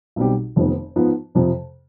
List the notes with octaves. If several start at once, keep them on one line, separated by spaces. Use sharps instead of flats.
B1 B2 G3 C4 G4
F1 F2 D#3 B3
G#2 F3 B3 F4
F2 C3 F3